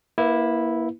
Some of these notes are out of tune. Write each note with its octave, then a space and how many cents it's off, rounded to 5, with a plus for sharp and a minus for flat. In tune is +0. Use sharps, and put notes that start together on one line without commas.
A#3 +25 E4 -5 B4 +0